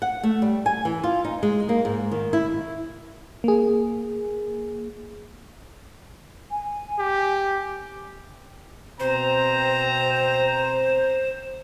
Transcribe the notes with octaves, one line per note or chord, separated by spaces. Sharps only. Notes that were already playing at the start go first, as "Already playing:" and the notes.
F#5
A3
G3
G#5
E3
F4
D#4
G#3
A#3
G#2
D#3
E4
A#3 G#4
G#5
G4
B2 C4 C5 A#5